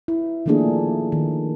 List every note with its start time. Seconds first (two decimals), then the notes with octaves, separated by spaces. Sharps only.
0.08 E4
0.46 D#3 F3 A3 A#3 D4 G#4
1.12 D#3